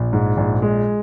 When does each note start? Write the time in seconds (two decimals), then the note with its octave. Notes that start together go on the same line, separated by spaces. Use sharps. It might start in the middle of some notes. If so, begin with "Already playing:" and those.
Already playing: A#1
0.13 G#2
0.37 A#1
0.62 G#3